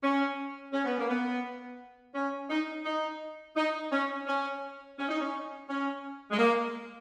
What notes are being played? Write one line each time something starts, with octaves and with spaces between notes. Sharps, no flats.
C#4
C#4
B3
A#3
B3
C#4
D#4
D#4
D#4
C#4
C#4
C#4
D#4
C#4
C#4
G#3
A#3